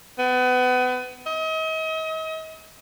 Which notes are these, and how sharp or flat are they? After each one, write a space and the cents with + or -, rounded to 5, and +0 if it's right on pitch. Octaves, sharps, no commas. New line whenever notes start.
B3 +30
D#5 +40